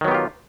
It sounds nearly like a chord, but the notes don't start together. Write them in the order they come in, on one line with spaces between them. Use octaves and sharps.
D#3 F#3 B3 G4 F4